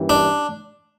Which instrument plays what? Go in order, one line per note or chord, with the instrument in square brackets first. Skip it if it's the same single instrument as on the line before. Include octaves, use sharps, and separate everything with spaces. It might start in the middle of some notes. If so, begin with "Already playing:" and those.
Already playing: [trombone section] G2 E3 A#3 C#4 G4
[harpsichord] D4